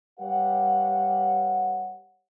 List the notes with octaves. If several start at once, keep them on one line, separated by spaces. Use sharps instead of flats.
G3 G4 B4 C#5 F5 F#5